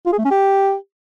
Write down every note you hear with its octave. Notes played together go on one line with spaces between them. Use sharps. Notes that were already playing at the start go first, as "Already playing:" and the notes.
F4
G#4
A3
C#4
G4